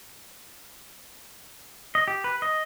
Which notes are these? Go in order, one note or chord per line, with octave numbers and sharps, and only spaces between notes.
D#5
G4
B4
D#5